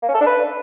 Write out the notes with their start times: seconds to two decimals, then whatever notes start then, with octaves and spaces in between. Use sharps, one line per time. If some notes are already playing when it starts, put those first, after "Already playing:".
0.03 A#3
0.09 C#4
0.15 A4
0.21 D4
0.27 B4